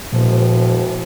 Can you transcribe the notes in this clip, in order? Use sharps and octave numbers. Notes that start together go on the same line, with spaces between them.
E1 A#2 F3